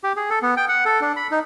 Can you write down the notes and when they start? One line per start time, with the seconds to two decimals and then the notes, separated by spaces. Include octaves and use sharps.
0.04 G4
0.16 G#4
0.30 A4
0.42 B3
0.57 G5
0.69 F#5
0.86 A4
1.01 D4
1.16 B5
1.31 D#4